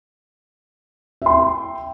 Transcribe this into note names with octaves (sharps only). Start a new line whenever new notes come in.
E5 G5 C6